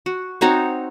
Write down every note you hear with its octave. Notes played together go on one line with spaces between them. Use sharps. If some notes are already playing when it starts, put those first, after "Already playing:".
F#4
C4 D#4 F#4 C#5